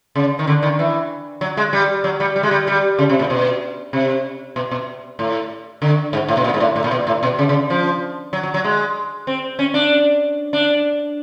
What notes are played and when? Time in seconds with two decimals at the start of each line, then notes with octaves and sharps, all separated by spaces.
0.15 C#3
0.39 D#3
0.47 D3
0.62 D#3
0.79 E3
1.41 F#3
1.57 G#3
1.73 G3
2.04 F#3
2.20 G3
2.36 G3
2.43 G#3
2.51 G3
2.67 G3
2.99 C#3
3.09 C3
3.19 A#2
3.30 B2
3.93 C3
4.56 B2
4.71 B2
5.19 A2
5.82 D3
6.13 G#2
6.28 A2
6.37 B2
6.44 A#2
6.54 G#2
6.60 A2
6.76 A2
6.84 A#2
6.91 B2
7.07 A2
7.23 B2
7.39 C#3
7.49 C#3
7.70 F3
8.33 F#3
8.43 F#3
8.54 F#3
8.64 G#3
9.27 C4
9.59 C#4
9.74 D4
10.53 D4